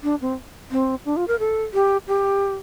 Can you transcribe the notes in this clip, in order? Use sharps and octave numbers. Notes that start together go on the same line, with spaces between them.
D4
C4
C4
D4
F4
A#4
A4
G4
G4